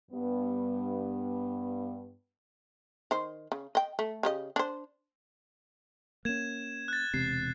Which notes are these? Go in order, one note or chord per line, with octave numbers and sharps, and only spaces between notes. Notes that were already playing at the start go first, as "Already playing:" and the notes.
G2 B3
D#3 C5
C#3
D#5 G5
A3
C#3 G4 D#5
D4 C5
A#3 C#4 G#6 E7
F#6 A6
E1 C3 C7